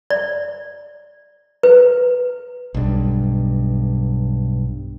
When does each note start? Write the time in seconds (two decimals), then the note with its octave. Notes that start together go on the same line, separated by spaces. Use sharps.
0.10 D5
1.63 B4
2.74 B1 G2